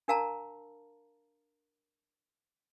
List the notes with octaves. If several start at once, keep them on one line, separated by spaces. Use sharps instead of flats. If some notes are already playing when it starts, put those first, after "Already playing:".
D4 A#4 F5 A5 A#5